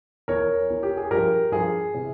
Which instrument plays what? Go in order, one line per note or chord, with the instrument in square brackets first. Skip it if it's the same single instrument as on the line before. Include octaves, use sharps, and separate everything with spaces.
[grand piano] E2 E3 A#4 C#5
E2 E3
G4
G#4
G2 F3 G4 A#4
G2 F3 G#4
C3 E3